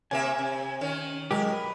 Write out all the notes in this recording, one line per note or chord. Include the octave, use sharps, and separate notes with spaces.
C3 A#3 E5 G#5
C3
D#3 C#4
F#3 G#3 G4 A#4
B4